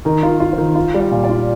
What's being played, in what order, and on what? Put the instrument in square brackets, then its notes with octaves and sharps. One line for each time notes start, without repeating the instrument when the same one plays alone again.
[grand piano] D#3 [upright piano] A#4
[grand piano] F4
[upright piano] A#4
[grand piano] F4
[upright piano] C5
[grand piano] D#3
F4
G3
[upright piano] D5
[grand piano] A#2
[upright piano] D5
[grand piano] F4